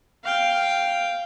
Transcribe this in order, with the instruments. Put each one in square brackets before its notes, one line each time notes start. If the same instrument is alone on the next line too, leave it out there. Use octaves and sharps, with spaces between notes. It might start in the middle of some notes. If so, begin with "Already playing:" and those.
[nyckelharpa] F5 G5